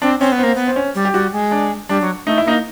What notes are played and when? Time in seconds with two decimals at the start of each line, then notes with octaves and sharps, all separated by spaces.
0.02 C4 D4
0.20 C4 C#4
0.32 B3
0.38 C4
0.43 A#3
0.55 B3
0.67 C4
0.76 C#4
0.95 G3
1.05 G4
1.14 G3 F#4
1.33 G#3
1.51 D4
1.89 G3 D4
2.02 F#3
2.26 A3 D#4
2.38 E4
2.45 A#3 D#4